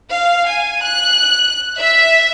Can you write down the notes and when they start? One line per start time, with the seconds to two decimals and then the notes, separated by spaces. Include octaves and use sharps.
0.10 F5
0.49 G#5
0.83 F#6
1.78 E5